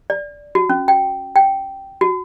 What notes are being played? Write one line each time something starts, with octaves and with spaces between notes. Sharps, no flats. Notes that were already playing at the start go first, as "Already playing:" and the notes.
D5
F#4
C#4
G5
G5
F#4